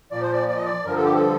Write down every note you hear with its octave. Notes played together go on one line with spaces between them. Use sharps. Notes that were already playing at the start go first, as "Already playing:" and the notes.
A#2 F3 D5
C5
D5
D5
D#5
D5
G2 D3 F3 A#4
A4
G4
A4